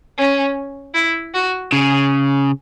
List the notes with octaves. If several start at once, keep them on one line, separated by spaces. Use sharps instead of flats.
C#4
E4
F#4
C#3 G#4